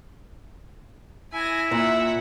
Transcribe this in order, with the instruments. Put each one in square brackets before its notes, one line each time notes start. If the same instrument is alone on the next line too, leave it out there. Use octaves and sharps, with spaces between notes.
[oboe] E4 [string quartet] G#5 A#6
[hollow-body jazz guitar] A#2 [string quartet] E5 F#5